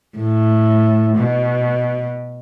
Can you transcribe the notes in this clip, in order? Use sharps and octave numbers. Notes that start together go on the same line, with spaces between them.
A2
B2